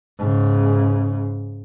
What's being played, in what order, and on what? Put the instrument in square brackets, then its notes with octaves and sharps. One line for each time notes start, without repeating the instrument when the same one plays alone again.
[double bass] G#2 C#3